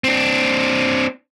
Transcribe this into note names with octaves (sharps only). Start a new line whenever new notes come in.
C4 D4